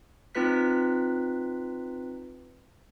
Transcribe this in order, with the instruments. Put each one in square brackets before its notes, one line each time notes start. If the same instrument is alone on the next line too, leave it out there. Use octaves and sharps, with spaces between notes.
[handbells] C4 D#4 F4 B4 F#6 B6